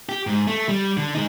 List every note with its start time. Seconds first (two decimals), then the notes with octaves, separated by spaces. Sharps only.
0.09 G4
0.27 G#2
0.48 A3
0.69 G3
0.97 D3
1.15 G#3 D#4